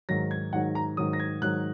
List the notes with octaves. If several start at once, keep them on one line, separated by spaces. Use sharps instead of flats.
G#2 D#3 F#3 A#6
G#6
G#2 D#3 F#3 F#5
A#5
G#2 D#3 F#3 D#6
A#6
G#6
G#2 D#3 F#3 F#6